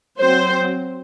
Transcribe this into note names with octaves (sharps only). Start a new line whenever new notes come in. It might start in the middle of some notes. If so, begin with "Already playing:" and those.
F#3 C4 C5